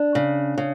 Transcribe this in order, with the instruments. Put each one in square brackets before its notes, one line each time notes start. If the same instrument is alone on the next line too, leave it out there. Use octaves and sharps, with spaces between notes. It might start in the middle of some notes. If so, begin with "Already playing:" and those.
Already playing: [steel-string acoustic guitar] D4
C#3
C#3